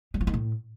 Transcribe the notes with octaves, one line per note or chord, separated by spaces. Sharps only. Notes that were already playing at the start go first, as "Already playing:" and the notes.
G3
F3
D#3
A2